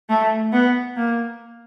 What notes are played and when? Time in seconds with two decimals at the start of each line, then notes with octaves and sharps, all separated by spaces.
0.09 A3
0.53 B3
0.97 A#3